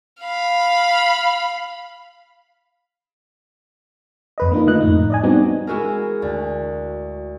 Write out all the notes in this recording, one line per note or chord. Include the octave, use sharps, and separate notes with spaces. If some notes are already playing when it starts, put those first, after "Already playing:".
F5 B5
F2 B4 D#5
A#3 D4 D#4 F4
D3 A3 D#5 F#6
F2 A2 D#4
D5 D#5 G#5
G3 B3 C4 D4 D#4 F#4
G#3 E4 F#4 G#4 A#4
D2